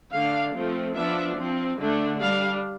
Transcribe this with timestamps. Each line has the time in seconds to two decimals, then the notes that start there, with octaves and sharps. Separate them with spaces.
0.12 D3 A3 D4 F5
0.54 F3 A3 C4
0.96 F3 B3 D4 E5
1.37 F3 C4
1.79 D3 A3 D4
2.20 G3 D4 F5